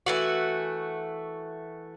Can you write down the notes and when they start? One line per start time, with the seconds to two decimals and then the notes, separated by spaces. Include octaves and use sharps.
0.06 E3 A3 F#4